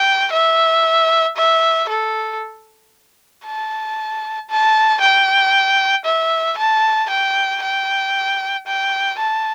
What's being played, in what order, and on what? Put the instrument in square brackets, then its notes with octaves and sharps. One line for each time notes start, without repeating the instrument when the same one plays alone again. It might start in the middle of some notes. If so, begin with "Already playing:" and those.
Already playing: [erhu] G5
E5
E5
A4
A5
A5
G5
E5
A5
G5
G5
G5
A5